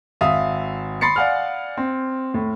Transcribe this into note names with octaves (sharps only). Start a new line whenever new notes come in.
G#1 E5 F5 D#6
B5 C6 A6 C7 C#7
D5 F5 F#5 G#5 F6
C4
A2